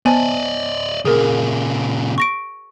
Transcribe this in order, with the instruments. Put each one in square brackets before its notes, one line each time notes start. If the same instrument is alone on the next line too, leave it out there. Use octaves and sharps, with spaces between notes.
[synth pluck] B3 C5 A5 [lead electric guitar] D5 D#5 [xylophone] G#5
[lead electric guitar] A#2 C#3 [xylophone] G#4 A#4
[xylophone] C#6 A#6 D7